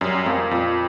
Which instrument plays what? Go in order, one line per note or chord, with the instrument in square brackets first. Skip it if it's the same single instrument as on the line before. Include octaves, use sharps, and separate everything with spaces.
[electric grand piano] F#2 [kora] G3
[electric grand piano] F2 [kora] A#3
[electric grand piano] F2 [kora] A#2